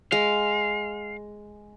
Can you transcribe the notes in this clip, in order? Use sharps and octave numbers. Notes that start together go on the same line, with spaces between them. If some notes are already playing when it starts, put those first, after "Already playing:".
G#3 F5